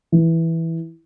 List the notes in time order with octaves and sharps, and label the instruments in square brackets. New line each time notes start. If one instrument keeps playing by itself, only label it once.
[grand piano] E3